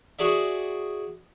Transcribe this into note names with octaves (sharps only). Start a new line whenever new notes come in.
F#4 G#4 D5 E5